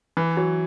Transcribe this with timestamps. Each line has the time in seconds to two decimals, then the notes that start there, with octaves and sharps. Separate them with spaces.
0.17 E3
0.37 F#3